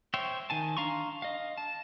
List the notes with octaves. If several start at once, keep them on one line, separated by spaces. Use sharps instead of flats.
C5 C#5 E5 G5
D#3 G#5 A5
D4 F5 A#5 C6 C#6
D#5 F5
A5